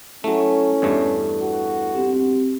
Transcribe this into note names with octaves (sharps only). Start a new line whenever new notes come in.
F#3 A3 C#4 E4 A4
E2 G2 A3
F#4
C4 G4